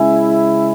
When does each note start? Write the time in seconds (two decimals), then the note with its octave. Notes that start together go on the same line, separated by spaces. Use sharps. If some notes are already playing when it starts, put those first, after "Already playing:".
Already playing: C#3 G#3 C#4 E4 G#5